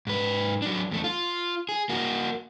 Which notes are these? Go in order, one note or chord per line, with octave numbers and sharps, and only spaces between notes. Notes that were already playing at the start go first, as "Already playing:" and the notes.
G#2 B4
F#3 D4
E2 A3
F4
G#4
A#3 F#4